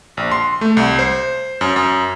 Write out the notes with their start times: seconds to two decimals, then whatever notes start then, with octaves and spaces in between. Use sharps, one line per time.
0.17 A#1
0.32 C6
0.61 A3
0.77 C2
0.99 C5
1.61 F#2
1.76 F#2